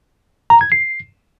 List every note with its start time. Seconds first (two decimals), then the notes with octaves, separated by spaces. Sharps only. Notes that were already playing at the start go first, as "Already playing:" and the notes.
0.50 A#5
0.61 G#6
0.72 C7